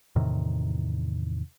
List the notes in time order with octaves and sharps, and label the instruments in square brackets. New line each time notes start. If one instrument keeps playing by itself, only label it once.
[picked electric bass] E2 A2 C3 D#3